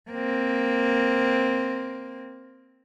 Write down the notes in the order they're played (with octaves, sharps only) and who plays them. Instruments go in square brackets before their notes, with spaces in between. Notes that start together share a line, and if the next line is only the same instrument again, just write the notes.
[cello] A#3 C4